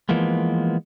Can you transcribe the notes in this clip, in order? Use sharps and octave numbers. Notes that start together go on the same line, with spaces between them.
E3 F3 G#3 A#3 B3